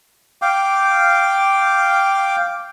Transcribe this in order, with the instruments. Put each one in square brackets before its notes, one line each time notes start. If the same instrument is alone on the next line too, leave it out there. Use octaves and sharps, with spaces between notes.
[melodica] F5 G5 D6